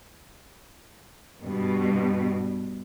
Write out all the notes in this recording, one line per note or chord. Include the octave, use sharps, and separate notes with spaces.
G2 B2